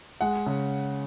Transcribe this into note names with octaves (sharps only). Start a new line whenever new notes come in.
G#3 F#5
C#3